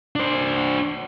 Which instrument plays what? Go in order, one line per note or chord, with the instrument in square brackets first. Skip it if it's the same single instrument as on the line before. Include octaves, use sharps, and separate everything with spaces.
[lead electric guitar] D4 C5